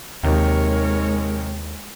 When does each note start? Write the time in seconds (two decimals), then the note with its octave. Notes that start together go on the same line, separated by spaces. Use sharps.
0.23 D#2 C3 D#3 G#3 A#4 C#5